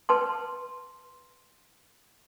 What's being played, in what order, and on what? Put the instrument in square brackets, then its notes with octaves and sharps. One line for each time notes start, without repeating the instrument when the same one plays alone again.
[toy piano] B4 A5 C6